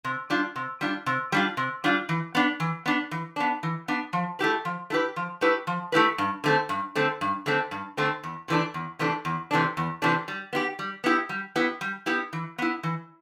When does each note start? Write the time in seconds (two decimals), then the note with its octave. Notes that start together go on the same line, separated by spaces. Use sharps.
0.04 C3
0.30 G3 D4 F4
0.56 C3
0.81 G3 D4 F4
1.06 C3
1.32 G3 D4 F4
1.57 C3
1.84 G3 D4 F4
2.09 E3
2.35 B3 D4
2.60 E3
2.86 B3 D4
3.11 E3
3.36 B3 D4
3.63 E3
3.88 B3 D4
4.13 F3
4.39 A3 E4 G4 B4
4.65 F3
4.90 A3 E4 G4 B4
5.16 F3
5.41 A3 E4 G4 B4
5.67 F3
5.92 A3 E4 G4 B4
6.18 G2
6.44 D3 A3 C4
6.69 G2
6.95 D3 A3 C4
7.21 G2
7.46 D3 A3 C4
7.71 G2
7.97 D3 A3 C4
8.23 E2
8.48 C3 E3 A3 D4
8.74 E2
8.99 C3 E3 A3 D4
9.25 E2
9.51 C3 E3 A3 D4
9.77 E2
10.02 C3 E3 A3 D4
10.28 G3
10.53 B3 E4 G4
10.79 G3
11.04 B3 E4 G4
11.29 G3
11.56 B3 E4 G4
11.81 G3
12.06 B3 E4 G4
12.33 E3
12.58 B3 E4
12.83 E3